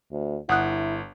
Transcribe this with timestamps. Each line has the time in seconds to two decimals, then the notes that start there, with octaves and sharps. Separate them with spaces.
0.12 D2
0.49 G1 E4 F#5 D#6 F#6